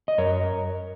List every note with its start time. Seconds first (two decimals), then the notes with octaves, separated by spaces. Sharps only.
0.08 D#5
0.18 F#2 A#4 C#5